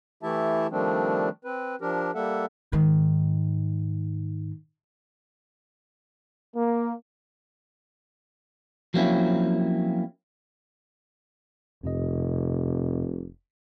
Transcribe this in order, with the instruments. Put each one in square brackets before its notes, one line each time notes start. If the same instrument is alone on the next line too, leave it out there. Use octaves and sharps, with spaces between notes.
[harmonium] E3 A3 E4 G4 E5 A5
D#3 F3 G3 A3 C4 D4
C4 B4
F3 D4 G4 A#4
G3 A#3 A4 E5 F#5
[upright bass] G#2 D#3
[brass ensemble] A#3
[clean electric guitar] F3 F#3 A#3 C4 C#4 E4
[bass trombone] F1 [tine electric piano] F2 C3 D#5